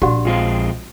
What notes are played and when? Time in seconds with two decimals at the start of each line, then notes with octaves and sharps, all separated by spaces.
0.02 A#1 D4 F#4 G4 F#5
0.25 F2 G#3 C4 F4